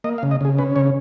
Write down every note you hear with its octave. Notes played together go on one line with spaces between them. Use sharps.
A#3 D#5
F5
C#3
D#5
C#3 G#4
C#4 B4
C#3 C#5